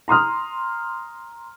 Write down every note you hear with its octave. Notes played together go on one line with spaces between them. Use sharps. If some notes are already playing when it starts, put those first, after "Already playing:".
A#5 C6 D#6 F6